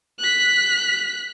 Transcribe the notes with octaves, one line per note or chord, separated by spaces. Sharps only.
F#6 B6